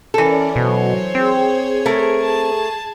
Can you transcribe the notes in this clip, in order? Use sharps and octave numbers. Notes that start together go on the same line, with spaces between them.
E3 C#4 A4 A#4 D5
B2 F#3 C5 C#5
C4 G#4 G#6
A3 A#4
A5